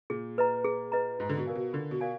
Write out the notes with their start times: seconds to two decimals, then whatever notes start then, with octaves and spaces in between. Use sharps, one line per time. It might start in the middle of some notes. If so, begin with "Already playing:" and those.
0.10 A#2 G#4
0.38 B4 D#5 A#5
0.65 G#4
0.92 B4 D#5 A#5
1.19 G#2 F4
1.29 D3
1.37 B2
1.46 A#4 D5 F5 G#5
1.55 B2
1.73 D3 F4
1.91 B2
2.01 A#4 D5 F5 G#5